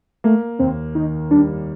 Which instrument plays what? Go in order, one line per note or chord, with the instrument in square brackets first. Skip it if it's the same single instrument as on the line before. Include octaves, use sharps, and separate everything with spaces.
[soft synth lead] A3 [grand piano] A#3
[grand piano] D#2 [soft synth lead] C4
[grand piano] D#3 [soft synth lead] D#4
[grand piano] G3 [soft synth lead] D4